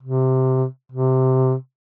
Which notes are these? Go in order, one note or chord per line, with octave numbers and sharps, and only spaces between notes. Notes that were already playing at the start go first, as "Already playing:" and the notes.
C3
C3